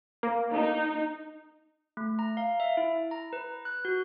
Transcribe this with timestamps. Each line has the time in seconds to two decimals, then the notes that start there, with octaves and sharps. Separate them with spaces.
0.23 A#3
0.55 D#4
1.97 A3
2.19 A#5
2.37 F5
2.60 E5
2.77 E4
3.11 A#5
3.33 B4
3.65 F#6
3.85 F#4